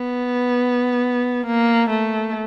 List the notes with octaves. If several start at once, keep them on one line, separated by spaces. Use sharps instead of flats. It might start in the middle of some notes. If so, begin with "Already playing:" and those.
Already playing: B3
A#3
A3